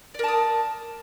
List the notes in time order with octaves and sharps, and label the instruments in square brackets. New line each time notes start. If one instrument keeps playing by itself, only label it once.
[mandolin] D5
A#4
A5
D#6